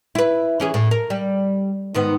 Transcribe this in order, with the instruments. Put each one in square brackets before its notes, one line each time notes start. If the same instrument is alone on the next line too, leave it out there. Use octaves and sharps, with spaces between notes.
[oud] E4 B4
E3 C#4 G#4
A2
A#4
G3
G#2 D#3 B3